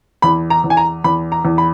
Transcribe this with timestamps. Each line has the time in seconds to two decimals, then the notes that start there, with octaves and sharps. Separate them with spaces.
0.22 E2 B5
0.50 A#5
0.64 E2
0.70 G#5
0.77 A#5
1.04 E2 B5
1.32 A#5
1.45 E2
1.58 B5